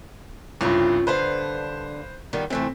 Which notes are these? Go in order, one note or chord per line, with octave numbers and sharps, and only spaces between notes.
C2 G2 C#3 C4 F4
G2 D3 B4 C5 F5
D#3 G3 B3
C3 E3 A3 C4